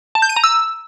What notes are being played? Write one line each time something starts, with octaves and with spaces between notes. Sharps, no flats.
A5
G6
D#7
A#5
E6